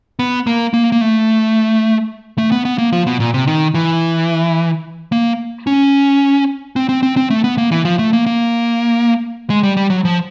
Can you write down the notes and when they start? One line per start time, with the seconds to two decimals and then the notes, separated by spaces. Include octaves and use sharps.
0.19 B3
0.47 A#3
0.74 A#3
0.92 A#3
1.01 A3
2.38 A3
2.52 B3
2.65 B3
2.78 A#3
2.93 F3
3.07 B2
3.20 A#2
3.34 C3
3.47 D#3
3.74 E3
5.12 A#3
5.67 C#4
6.76 C4
6.89 C4
7.03 C4
7.17 C4
7.30 A3
7.44 B3
7.58 A#3
7.72 E3
7.85 F3
7.99 A3
8.13 A#3
8.26 A#3
9.50 G#3
9.63 G3
9.77 G3
9.90 F#3
10.05 F3